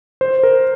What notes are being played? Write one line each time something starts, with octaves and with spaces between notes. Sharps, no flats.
C5
A#4